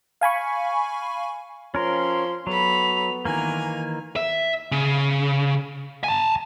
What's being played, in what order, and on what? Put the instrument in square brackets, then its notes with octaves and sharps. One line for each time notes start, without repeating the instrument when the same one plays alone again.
[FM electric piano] F5 G#5 B5 C#6
[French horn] F3 [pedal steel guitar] C#4 A#4 [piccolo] C6
[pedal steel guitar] F#3 [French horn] B3 [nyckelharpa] A4 B5 [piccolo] F7
[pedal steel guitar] D#3 E3 A#3 [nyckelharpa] G#5 [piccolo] A#5
[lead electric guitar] E5
C#3
G#5 A5